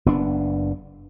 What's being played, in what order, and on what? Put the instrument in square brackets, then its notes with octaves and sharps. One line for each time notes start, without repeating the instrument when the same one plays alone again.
[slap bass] F#1 B3 D4